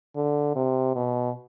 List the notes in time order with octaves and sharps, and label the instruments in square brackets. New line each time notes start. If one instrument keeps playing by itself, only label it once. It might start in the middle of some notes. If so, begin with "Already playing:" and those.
[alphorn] D3
C3
B2